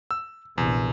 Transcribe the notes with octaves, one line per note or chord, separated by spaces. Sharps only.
E6
A#1 E2 C3